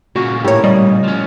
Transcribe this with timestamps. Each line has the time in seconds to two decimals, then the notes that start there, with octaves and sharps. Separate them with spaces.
0.16 A#2 C#3 A#3 F#4
0.44 A2 G4 A#4 C#5
0.64 G3 D#5
1.04 F3 C#4